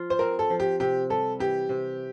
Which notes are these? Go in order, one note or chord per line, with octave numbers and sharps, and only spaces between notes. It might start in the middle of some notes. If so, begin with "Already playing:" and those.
Already playing: F3 F4
C5
C4 A#4
A4
F3
G4
C3 G4
G3 A4
E3 G4
C3